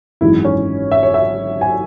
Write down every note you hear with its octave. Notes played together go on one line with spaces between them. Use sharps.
G#1 F#2 E3 G#3 E4
C#4
E5
C#5
E5
G#5